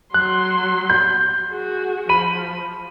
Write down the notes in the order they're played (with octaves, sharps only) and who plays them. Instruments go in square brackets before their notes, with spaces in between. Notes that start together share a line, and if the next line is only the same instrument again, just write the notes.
[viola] F#3 C6 [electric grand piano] F#6
[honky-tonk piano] G6
[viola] F#4 G#4
[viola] F3 [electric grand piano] B5 D#7